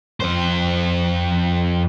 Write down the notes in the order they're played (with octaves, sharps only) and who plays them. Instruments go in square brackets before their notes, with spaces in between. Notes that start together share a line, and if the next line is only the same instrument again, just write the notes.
[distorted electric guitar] F2 C5